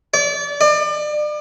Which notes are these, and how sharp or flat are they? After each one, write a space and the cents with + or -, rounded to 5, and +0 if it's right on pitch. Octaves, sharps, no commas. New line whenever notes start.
D5 -30
D5 +35